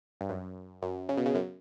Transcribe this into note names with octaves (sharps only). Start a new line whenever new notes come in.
G2
F#2
F#2
C#3
B2
C#3
F#2